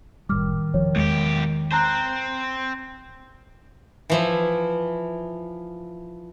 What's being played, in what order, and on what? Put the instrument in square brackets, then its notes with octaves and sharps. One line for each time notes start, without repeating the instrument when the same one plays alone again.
[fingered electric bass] F#1 A2 G3 [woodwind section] D#3 [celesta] D6 F6
[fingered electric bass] E1 F3 [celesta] C#5
[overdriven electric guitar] B1 G4 [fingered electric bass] E2 G#3
[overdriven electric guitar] C4 C5 [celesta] A5 A#5 F#6
[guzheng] E3 F3 E4